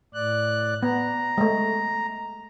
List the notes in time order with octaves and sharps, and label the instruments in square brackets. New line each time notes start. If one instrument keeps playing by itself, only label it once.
[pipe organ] A2 D5 F#6
[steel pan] B3 [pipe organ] A#5
[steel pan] G#3 A3